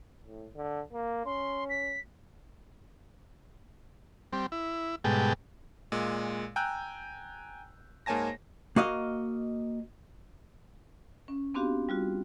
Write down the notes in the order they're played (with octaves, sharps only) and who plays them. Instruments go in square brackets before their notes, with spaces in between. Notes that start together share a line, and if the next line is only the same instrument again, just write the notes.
[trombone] A2
D3
A#3
[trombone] C#4 [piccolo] C6
[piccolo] B6
[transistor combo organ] G3 C4
E4
G#2 B2 G3 G#3 A4 G5
[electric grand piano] A#2 G#3
G5 G#5 A#5 E6 F#6 G6
G#2 A#3 C#5 G#5 A5 A#6
[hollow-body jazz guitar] A#3 F#4 D#5 F5
[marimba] C#4
B3 C4 D4 F#4 G4 F5
G3 F4 F#4